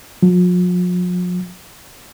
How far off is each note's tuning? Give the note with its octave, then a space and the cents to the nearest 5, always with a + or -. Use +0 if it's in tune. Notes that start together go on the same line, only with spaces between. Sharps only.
F3 +45